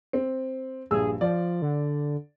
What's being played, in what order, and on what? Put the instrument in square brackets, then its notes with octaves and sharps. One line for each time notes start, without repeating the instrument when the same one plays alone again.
[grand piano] C4
[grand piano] A#1 G2 E6 [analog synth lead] G#4
[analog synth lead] F3 [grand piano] D5
[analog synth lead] D3